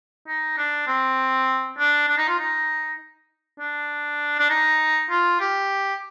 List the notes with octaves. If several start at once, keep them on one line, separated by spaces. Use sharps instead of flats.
D#4
D4
C4
D4
D4
D#4
F4
D#4
D4
D4
D#4
F4
G4